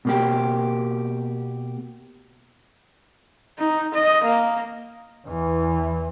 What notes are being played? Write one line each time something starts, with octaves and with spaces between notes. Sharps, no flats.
B2 A#3 G4
D#4
D#5
A#3
E2 E3